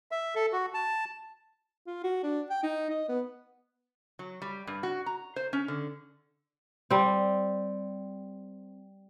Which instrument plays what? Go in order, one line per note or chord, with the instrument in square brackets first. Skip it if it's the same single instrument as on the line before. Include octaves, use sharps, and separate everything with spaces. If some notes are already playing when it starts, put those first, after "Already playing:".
[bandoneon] E5
A4
F#4
A5
[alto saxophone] F4
F#4
D4
G5
D#4
D#5
B3
[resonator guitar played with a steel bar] F#3
G3
G2
F#4
A#5
C5
C#4
D3
[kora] G3 C4